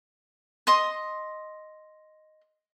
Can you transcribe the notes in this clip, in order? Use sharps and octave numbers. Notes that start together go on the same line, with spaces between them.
D#5 C6 D#6